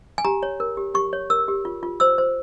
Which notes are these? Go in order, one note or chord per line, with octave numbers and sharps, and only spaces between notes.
G#5
G4 A#5
C#5
A#4
G4
G4 C#6
C#5
A#4 E6
G4
F4
F4
C5 E6
C5